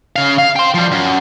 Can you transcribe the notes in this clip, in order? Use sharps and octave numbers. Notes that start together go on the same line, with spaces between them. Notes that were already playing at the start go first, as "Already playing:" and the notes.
C#3 F5
F5
G5 C6
F3 G3
F#2